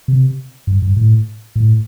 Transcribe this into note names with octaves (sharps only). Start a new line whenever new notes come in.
C3
G2
G2
A2
A2